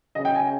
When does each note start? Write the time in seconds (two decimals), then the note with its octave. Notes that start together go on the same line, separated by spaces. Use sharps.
0.15 C#3 D#5
0.25 G5
0.35 G#5